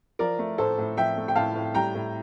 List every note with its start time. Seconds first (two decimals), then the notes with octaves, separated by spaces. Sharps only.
0.19 F3 A#4 D5
0.39 A3
0.58 A2 A4 C5
0.78 A2
0.97 F3 E5 G5
1.17 A3
1.28 G5
1.35 A2 F5 A5
1.55 A2
1.74 G3 G5 A#5
1.95 A2